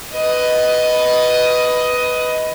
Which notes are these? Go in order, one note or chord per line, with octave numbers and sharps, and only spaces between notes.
B4 D#5